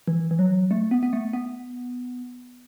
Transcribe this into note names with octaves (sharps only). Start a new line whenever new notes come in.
E3
E3
F#3
A3
B3
B3
A3
B3